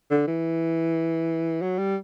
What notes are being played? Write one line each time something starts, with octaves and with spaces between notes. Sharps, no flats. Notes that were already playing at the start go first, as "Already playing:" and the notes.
D3
E3
F#3
G3